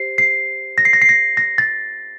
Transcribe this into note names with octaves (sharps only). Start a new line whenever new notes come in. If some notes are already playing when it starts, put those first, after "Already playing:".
Already playing: G4 C5 C7
C7
A#6
C7
A#6
C7
A#6
A#6
A6